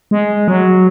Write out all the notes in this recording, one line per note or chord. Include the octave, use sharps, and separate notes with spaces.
G#3
F#3